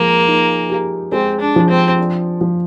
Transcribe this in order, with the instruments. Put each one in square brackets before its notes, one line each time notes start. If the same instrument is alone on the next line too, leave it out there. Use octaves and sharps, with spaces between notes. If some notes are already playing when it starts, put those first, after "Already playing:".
Already playing: [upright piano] F3 G#3 [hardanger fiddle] A#3
[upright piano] D#4
G4
[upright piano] G#3 [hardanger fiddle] C4
[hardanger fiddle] D4
[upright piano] F3
[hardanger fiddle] C4
[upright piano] D4
F3